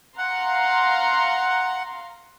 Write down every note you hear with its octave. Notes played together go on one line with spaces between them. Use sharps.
F5 F#5 A#5 C6